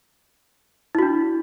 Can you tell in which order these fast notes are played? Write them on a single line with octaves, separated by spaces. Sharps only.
E4 F#4 D4